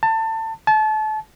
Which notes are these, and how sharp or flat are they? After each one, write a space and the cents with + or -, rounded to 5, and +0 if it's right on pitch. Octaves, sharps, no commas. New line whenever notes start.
A5 +25
A5 -30